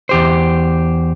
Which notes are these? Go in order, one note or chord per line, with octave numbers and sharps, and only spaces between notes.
E2 G4 C5